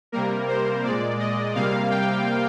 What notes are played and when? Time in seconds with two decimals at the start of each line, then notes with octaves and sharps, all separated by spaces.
0.12 C3 G3 A#3 A#4
0.48 C5
0.84 A#2 G#3 D5
1.19 D#5
1.55 C3 G3 A#3 F5
1.90 G5